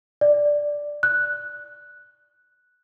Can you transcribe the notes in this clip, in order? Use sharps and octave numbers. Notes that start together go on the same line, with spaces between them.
D5
F#6